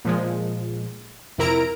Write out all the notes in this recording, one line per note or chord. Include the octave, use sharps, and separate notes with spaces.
A#2 F3 G#3
F2 C3 E4 A#4 A#5 D7